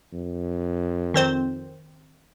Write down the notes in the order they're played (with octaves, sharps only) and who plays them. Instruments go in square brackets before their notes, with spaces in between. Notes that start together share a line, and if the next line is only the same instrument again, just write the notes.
[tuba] F2
[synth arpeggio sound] D#3 C4 C5